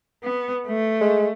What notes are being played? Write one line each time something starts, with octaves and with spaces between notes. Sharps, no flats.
B3
A3
G#3